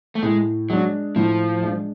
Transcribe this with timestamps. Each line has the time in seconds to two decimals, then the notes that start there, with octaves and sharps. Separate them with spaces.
0.15 A3
0.23 A2 G#3
0.70 F#3 G#3 D4
1.16 A2 F3
1.62 G#3 D4